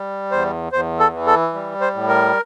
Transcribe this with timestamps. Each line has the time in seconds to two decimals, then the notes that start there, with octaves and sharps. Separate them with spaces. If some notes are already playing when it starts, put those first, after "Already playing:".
Already playing: G3
0.31 E2 C5
0.73 E2 C5
0.99 A4
1.13 E3
1.27 A4
1.54 G3
1.81 C5
1.94 A2
2.08 A#4